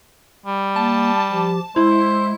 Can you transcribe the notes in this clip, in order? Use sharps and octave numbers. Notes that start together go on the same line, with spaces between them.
G3
A#3 A5
F3 G4
G#3 E4 C5